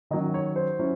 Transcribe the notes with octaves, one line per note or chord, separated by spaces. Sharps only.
D#3 F#3 C#4 D#5
C#5
C5
F#3 C#4 E4